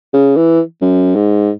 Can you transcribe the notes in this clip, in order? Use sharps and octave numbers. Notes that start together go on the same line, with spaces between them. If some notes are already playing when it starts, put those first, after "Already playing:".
C#3
E3
F#2
G#2